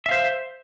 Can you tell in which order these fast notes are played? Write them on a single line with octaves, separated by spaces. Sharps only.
E5 F5 C5